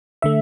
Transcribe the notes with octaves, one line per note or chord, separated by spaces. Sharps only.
D3 A3 E5